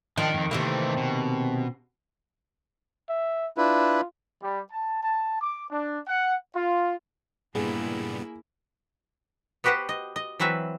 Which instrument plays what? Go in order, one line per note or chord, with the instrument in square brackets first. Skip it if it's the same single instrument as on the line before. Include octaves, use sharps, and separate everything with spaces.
[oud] D#3 [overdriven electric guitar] F3 D4
[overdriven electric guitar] F2 G#2
[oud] C3 D#3 A#3 [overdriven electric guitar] E3 A3
[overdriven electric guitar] B2
[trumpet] E5
[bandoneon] D4 E4 B4 [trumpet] F4
[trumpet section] G3
A5
A5
D6
D4
F#5
F4
[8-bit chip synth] G2 G3 B3 [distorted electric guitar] A#2 C#3 [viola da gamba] A#3 E4 [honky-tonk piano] G#4
[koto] B3 F#4 G4 B4 C5 F#5
D#5
D#5
E3 F#3 C4 B4 E5